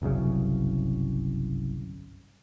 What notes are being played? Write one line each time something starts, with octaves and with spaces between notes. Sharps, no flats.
G1 C2 F#2 C#3